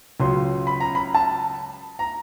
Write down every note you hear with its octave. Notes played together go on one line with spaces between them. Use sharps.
C#2 C#3 F#3 C6
B5
A#5
B5
A5
A#5